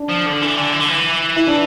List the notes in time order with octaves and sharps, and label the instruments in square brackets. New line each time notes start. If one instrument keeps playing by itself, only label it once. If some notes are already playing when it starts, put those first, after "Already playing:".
Already playing: [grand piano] D4
[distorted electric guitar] F3
D3
E3
D3
E3
D3
E3
[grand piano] E4
D4